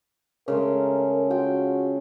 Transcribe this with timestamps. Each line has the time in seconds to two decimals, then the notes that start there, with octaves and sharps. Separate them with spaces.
0.48 C#3 G#3 A3 A#4
1.30 F4 F#4 G5